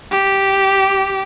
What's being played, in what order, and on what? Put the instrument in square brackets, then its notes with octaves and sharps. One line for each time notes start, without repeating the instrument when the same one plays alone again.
[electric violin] G4